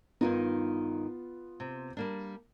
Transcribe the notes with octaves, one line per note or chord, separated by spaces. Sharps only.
G2 D#3 B3 D#4 F4
C3
G3 A#3 D4